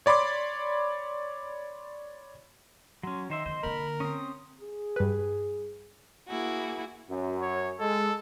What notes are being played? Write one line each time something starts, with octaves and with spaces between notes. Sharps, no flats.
C#5 D5 B5 C6 D6
F#3 C#4 C6
D#3 C5 D#5 E5
D#3 B3 C5
D3 A#3 A#4 B5
C4 C#4 D#6
G#4
G2 B4
A#3 E4 F#4 G#4
F#2
C#5
G#3 A4